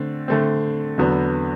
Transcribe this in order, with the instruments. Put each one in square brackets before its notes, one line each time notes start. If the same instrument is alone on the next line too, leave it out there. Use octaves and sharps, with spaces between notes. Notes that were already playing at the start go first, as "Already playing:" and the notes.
Already playing: [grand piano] D3 A3 C4
D3 A3 C4
E2 D3 F#3 B3 F#4